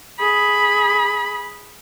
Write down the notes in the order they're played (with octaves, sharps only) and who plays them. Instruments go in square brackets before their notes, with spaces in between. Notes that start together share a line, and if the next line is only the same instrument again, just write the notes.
[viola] G#4 B5